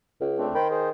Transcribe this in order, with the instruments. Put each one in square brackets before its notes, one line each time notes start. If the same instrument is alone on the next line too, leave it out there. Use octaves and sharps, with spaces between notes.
[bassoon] C#2
[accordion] A3 C4 D4
[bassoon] D#3 [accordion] C5 G5 B5
[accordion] G#4 C5